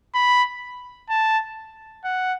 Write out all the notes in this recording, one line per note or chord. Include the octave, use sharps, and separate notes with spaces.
B5
A5
F#5